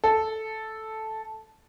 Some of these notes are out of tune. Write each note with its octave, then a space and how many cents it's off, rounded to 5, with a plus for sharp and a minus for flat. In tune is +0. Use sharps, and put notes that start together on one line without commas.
A4 -5